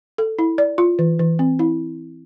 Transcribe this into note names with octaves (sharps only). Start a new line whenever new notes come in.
A4
E4
D5
F4
E3
E3
C4
E4